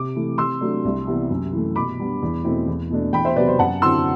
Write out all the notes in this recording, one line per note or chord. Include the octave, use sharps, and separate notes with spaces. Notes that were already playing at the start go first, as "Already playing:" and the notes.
Already playing: C3 D6
E3 A3
C3 C6 E6
F#3 A3 D4
C2
C3 E3 B3
F#2
E3 A3
B2 B5 D6
G3 B3 D4
E2
B2 A3 C4 E4
E2
B2 A3 D4
E2 G5 B5
C5 E5
C3 F#3 B3 B4 D5
C5
F#2 F#5 A5
D3 F#3 C4 E4 C6 E6